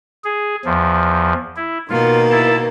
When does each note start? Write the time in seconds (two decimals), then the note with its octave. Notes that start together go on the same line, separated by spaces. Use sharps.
0.24 G#4
0.65 E2 F3
1.56 E4
1.90 B2 D#3 A#3 F4
2.31 E4 A5